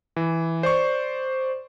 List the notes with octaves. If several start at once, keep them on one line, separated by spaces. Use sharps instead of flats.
E3
C5 D5 C#6